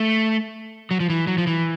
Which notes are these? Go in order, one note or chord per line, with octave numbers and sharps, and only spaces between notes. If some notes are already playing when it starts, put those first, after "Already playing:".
Already playing: A3
F#3
F3
E3
F#3
F3
E3